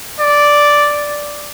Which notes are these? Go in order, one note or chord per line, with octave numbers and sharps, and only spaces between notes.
D5